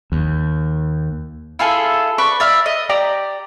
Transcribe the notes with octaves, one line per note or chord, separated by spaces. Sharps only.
D#2
E4 F4 G#4 A4
B4 D5 C#6
D5 E5 F5
D#5
G4 D5 A#5